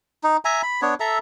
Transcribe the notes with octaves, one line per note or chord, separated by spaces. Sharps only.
D#4
E5 G#5 A#5
B5
B3 D4 C#5
A4 E5 A#5